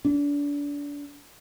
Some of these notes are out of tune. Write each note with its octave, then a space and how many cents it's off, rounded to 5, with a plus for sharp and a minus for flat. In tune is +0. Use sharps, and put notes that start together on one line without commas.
D4 -30